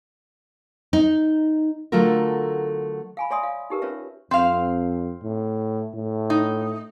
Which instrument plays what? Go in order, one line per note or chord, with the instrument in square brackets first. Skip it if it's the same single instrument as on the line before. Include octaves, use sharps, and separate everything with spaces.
[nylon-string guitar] D#4
D3 F#3 A3 F4 A4 A#4
[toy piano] F5 G#5 B5
C#5 D5 E5 G#5 C6 D#6
F5
D#4 G4 A#4 B4
C#4 F4 B4 C#5 E5
[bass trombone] F2 [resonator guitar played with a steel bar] C4 F5
[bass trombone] A2
A2
[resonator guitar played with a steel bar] D#4